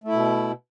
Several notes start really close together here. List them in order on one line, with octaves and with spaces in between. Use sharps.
A3 E4 B2